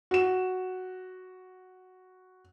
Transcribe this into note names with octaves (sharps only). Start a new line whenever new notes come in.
F#4 E7